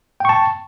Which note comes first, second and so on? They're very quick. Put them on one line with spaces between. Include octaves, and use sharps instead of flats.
G5 C#6 A5